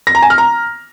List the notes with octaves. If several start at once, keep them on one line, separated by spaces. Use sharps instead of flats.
A#6
A#5
G#5
F6
A#5